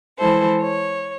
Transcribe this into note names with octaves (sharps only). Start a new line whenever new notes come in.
E3 G#3 E4 A4 C5
C#5